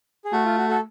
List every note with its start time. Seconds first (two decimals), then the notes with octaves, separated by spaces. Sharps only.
0.25 G#4
0.32 A3 F#4
0.45 F4
0.57 F#4
0.69 F#4 A4